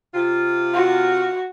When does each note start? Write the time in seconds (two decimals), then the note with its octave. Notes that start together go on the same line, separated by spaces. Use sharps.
0.14 C3 F4
0.74 F#4